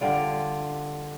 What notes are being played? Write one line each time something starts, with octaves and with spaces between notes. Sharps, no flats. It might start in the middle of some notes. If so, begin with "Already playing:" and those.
D3 G3 F4 D5